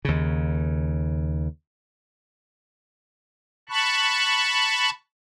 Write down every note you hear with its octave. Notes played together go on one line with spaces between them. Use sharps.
D#2 C#3
A5 B5 C#6 F#6